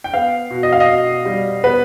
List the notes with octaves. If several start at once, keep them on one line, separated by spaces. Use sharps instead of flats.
G5
B3 F5
B2
D#5
F5
D#5
B2
G3
B3 B4